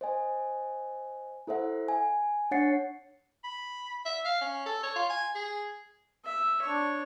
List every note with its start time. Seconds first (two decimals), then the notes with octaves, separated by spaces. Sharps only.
0.01 C5 D#5 G#5
1.47 E4 A4 C5 E5 F#5
1.88 G#5
2.51 D4 C#5 F#5 A6 C7 C#7
3.44 B5
4.05 E5
4.25 F5
4.41 C#4
4.66 A4
4.83 C#5
4.95 F4
5.10 G#5
5.35 G#4
6.25 E5
6.62 D4 C#5